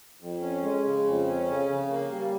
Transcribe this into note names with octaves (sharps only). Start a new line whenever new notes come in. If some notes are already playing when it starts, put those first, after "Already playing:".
F2
C#4
G#3
C#3
F2
C#4
C#3
C#3
A#3
G3